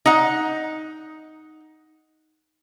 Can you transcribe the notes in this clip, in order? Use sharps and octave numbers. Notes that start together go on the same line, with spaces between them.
D#4 F#5